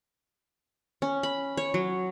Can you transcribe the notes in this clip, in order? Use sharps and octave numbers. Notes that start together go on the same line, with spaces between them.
C#4
B5
C#5
F#3